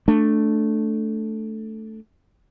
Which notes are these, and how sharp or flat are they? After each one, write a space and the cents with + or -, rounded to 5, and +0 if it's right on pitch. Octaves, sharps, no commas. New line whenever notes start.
A3 +0 D4 +0